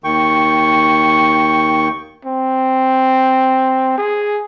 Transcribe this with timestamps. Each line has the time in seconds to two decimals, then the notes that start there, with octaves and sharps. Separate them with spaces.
0.04 D#2 D#3 G5 C#6
2.25 C4
3.98 G#4